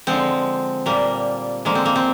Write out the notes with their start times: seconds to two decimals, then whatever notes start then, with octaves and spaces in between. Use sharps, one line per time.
0.07 D3 F3 G#3 C4
0.86 A#2 G3 A#3
1.65 D3 F3 G#3 A#3
1.75 C4
1.85 A#3
1.96 C4